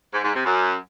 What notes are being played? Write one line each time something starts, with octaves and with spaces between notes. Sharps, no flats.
G#2
G#2
C3
F#2